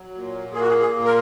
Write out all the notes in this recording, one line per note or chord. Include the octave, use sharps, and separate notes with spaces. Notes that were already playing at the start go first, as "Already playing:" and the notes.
Already playing: F#3
A#2
A#3 G#4
F#4
G#4
G#4
A#2
A#4